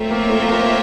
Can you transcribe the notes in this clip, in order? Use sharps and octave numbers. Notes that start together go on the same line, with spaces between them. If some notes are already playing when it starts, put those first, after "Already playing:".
Already playing: A3 C4 F4 A#4 C#5 E5
A#3
A3
A3
A#3